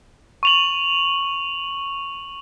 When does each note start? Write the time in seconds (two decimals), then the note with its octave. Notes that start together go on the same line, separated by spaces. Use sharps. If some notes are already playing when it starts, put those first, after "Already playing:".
0.43 C#6 F7 F#7